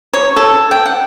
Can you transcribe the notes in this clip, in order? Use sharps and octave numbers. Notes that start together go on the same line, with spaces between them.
C#5
A4
G5
F#5